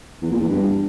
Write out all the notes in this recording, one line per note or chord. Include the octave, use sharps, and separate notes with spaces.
E2
A#2
E2
G2